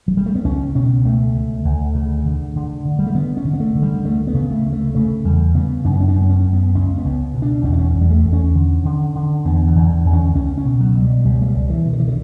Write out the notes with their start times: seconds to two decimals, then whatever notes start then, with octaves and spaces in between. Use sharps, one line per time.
0.08 F#3
0.17 G3
0.26 A3
0.35 B3
0.45 C#2 C#4
0.75 B2 C#4
1.05 C#2 A3
1.35 D2
1.65 D2
1.95 C#3
2.25 D3
2.56 D3
2.85 D3
2.99 G3
3.07 A3
3.14 D3 B3
3.37 C#4
3.45 D3
3.54 B3
3.60 A3
3.75 D3
3.83 G3
4.04 D2 A3
4.27 B3
4.34 C#3
4.50 A3
4.66 D2
4.73 A3
4.95 C#3 A3
5.24 E2 G3
5.54 C#3 B3
5.85 F#2 D4
5.93 B3
6.00 C#4
6.08 D4
6.15 F#2
6.21 B3
6.30 C#4
6.45 F#2
6.53 B3
6.75 C#2 C#4
6.98 B3
7.05 C#2
7.34 B2
7.42 D4
7.65 E2 C#4
7.73 D4
7.79 C#4
7.94 E2
8.01 G3
8.10 A3
8.25 E2
8.33 C#4
8.55 D3
8.85 D3
9.15 D3
9.45 E2 B3
9.67 E3
9.76 E2
9.90 D3
10.05 E2
10.13 C#4
10.35 C#2 C#4
10.58 C#4
10.65 B2
10.80 F#3
10.95 B2
11.02 G3
11.25 C#2 G3
11.42 A3
11.48 G3
11.55 C#2
11.70 E3
11.86 B2
11.93 D3
12.00 E3
12.08 D3